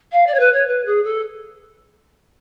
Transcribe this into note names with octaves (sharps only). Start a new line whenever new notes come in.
F5
D5
C#5
B4
C#5
B4
G#4
A4